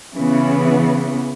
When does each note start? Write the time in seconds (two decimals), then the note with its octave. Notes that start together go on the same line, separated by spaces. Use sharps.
0.15 C#3 E3 B3